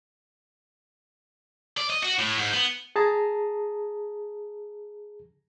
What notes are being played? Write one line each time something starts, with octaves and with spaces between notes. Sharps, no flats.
D5
D#5
F#4
A2
G#2
B3
G#4 A5 A#5